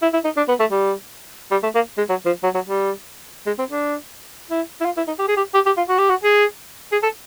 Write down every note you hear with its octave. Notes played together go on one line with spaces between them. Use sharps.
E4
E4
D#4
D4
B3
A3
G3
G3
A3
A#3
G#3
F#3
F3
F#3
F#3
G3
G#3
C4
D4
E4
E4
F4
E4
D#4
G4
G#4
G4
G4
G4
F4
F#4
G4
F#4
G#4
G#4
A4